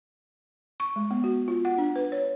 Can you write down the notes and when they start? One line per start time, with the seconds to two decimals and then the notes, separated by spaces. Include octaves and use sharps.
0.80 C#6
0.96 G#3
1.11 B3
1.24 F#4
1.48 F4
1.65 F#5
1.78 D4
1.96 B4
2.12 C#5